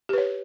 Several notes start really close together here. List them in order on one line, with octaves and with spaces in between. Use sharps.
G4 B4 C#5